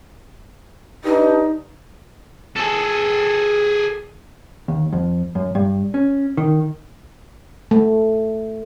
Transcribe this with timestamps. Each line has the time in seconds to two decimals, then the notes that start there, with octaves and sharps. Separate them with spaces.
1.04 D4 D#4 G4 B4
2.56 G#4 A4
4.68 D#2
4.93 F2
5.35 F#2
5.55 G2
5.94 C#4
6.37 D#3
7.71 A3